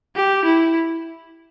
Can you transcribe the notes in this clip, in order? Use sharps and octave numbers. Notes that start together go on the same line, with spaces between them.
G4
E4